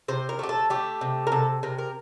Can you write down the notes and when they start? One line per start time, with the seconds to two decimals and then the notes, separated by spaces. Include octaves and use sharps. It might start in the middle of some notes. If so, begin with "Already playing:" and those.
0.08 C3 C5
0.29 A#4
0.39 A3 G4
0.49 A4
0.70 A3 G4
1.01 C3
1.27 A#4
1.32 C3 A4
1.63 C3 A#4
1.78 A#4